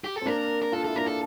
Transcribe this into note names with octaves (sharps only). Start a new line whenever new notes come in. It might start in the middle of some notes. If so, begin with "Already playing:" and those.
G4
A4
C4
A#3 D4 A#4
A#4
D4 F4 A4
E4 A4
A#3 D4 A#4
A4